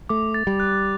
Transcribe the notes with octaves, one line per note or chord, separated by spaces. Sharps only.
A3 D6
A6
G3
F#6